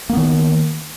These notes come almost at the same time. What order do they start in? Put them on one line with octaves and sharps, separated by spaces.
A#3 B3 D#3